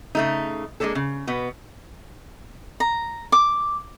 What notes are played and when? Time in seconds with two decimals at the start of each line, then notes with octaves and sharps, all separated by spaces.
0.15 C#3 A3 D#4
0.80 G#3 A#3 C#4 D4 A4
0.95 C#3
1.27 B2 B3
2.80 A#5
3.32 D6